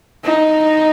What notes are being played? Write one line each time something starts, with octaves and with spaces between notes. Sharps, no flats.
D#4